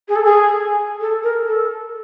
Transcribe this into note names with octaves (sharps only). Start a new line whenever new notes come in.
G#4
A4
G#4
A4
A#4
A4